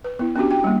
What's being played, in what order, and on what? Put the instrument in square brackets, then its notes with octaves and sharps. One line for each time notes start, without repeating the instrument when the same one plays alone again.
[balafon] B4
B3 E4
B3 C#4 D4 F#4 G4
F#4 G5
G3 A#3